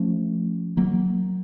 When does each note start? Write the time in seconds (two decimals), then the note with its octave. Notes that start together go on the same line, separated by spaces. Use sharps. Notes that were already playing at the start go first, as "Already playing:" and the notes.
Already playing: F3 A3 C#4
0.77 F#3 A#3